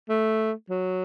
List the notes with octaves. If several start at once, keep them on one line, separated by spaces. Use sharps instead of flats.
A3
F#3